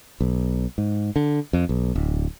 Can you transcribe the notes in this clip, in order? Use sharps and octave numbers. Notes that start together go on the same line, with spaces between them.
B1
G#2
D3
F2
B1
D1